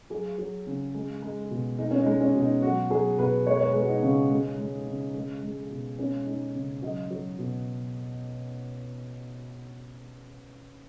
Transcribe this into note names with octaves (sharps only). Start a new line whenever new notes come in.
F#3 G#4
F#3
C#3
G#3
G#3
B2
G#3 D#4
C#4
D#4
G#3
C#4
B2
D#4
F#3 F#4
F#3 G#4
B2 B4
G#3 C#5
C#5
B4
G#3 G#4
F#4
D#4
C#3
G#3
G#3
C#3
G#3
G#3
B2
G#3 C#4
G#3 D#4
C#3
F#3 D#5
F#3
B2